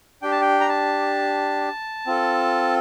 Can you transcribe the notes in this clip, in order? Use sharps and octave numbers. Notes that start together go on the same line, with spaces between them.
D4 G4 G5
A5
G5
A#5
A5
C4 F4 A4